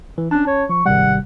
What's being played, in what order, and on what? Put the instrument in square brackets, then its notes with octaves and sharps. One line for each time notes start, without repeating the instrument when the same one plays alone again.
[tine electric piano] E3
[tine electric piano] C#4 A5 [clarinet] D4
[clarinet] C#5
[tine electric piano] F3 [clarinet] C#6
[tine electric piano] G#1 C3 G3 [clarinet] F#5